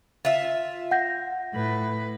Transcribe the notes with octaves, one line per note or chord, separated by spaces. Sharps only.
F4 E5
F#5 G6 A#6
A2 B4